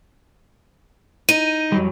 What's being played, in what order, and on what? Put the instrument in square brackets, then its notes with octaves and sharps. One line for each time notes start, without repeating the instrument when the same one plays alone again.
[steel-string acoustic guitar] D#4 [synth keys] D#7
[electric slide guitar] F2 F#3 G3